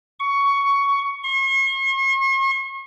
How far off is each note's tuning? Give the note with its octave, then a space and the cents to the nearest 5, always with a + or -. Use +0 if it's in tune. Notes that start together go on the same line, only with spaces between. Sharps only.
C#6 +15
C#6 -45